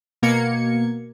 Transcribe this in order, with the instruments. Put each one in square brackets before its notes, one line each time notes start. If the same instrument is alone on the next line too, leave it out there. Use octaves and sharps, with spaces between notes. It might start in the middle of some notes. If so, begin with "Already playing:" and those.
[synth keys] B2 A#3 G#6 C#7